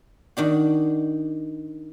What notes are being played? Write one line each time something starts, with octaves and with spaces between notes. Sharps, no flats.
D#3 D4 F#4